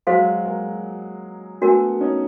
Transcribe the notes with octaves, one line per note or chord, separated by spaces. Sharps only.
F#3 G#3 F#4 A4 C5 F5
G#3 A#3
A3 B3 D4 F#4 A#4
C#4 D#4